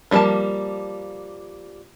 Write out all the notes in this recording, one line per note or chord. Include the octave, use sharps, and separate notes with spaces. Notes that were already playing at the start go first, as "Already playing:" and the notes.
F3 G3 G#3 A#3 A5